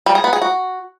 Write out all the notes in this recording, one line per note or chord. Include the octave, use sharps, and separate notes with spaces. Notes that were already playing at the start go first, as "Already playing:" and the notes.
G3
G#4
B3
G#4
F#4